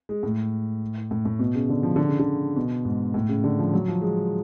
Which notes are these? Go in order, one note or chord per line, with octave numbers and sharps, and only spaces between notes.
G#3
A2
A2
A2
B2
C#3
D3
F3
D3
C#3
D3
B2
G#2
A2
C#3
D3
F3
F#3
F3
G#3